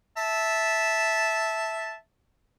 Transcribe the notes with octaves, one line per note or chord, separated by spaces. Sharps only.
E5 A5